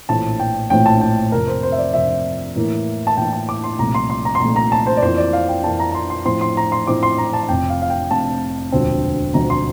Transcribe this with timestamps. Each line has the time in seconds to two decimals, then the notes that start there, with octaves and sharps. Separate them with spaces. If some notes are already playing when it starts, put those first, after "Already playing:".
0.09 A#1 A2 E3 A3 C4 A5
0.40 G5
0.70 A#1 A2 E3 A3 C4 G5
0.86 A5
1.01 G5
1.32 F2 C3 F3 A#4
1.48 C5
1.63 C5
1.72 E5
1.78 D5
1.93 F2 C3 F3 E5
2.56 A2 E3 A#3 E4
3.07 A5
3.17 A2 E3 A#3 E4 G5
3.32 A5
3.49 D6
3.64 C6
3.78 C2 A#2 F3 A3 A#5
3.95 C6
4.10 C6
4.25 A#5
4.35 C6
4.40 C2 A#2 F3 A3 A#5
4.56 A#5
4.72 A5
4.87 C5
4.97 D5
5.02 F2 E3 A#3 E4 C5
5.18 D5
5.33 F5
5.49 G5
5.63 F2 E3 A#3 E4 A5
5.80 A#5
5.91 A#5
5.95 C6
6.10 C6
6.25 A2 F3 C4 E4 C6
6.41 C6
6.57 A#5
6.72 C6
6.87 A2 F3 C4 E4 D6
7.03 C6
7.18 A#5
7.33 A5
7.49 F1 F2 C3 G5
7.70 F5
7.82 F5
7.90 G5
8.11 F1 F2 C3 A5
8.72 E1 D2 D3 F3 C4
9.34 E1 D2 D3 F3 C4 A#5
9.50 C6